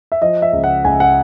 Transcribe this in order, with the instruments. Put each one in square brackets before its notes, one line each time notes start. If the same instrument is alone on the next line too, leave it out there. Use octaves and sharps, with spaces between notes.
[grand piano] E5
F3 D#5
E5
C#2
F#5
C#2 G#5
F#5